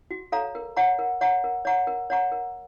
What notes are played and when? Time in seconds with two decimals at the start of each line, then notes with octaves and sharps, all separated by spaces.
0.11 F#4
0.32 A4 C#5 F5 A#5
0.55 A#4
0.76 C#5 F#5 A#5 C#6
0.99 A#4
1.21 C#5 F#5 A#5 C#6
1.44 A#4
1.65 C#5 F#5 A#5 C#6
1.87 A#4
2.10 C#5 F#5 A#5 C#6
2.32 A#4